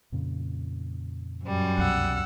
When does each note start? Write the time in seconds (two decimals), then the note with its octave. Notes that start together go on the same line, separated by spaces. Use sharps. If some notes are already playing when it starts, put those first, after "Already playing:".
0.12 F2 A#2 C#3
1.44 F#2 G3
1.78 C2 F2 B2 F#5 E6